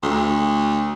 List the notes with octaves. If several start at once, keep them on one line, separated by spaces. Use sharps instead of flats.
D2